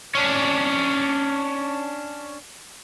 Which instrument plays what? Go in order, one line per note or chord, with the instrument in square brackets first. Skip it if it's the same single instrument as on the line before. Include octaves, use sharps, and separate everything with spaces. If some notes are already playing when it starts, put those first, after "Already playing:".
[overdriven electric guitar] C#4 D4